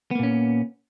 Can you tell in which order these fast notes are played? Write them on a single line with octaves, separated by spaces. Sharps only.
B3 A#3 A#2 C#4